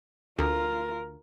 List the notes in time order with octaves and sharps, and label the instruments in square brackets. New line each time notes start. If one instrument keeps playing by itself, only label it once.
[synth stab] D2 [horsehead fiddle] F4 A#4